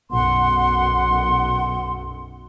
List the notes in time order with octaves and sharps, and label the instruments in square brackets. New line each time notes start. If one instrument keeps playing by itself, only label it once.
[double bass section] B1 F#2 [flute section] F#5 C6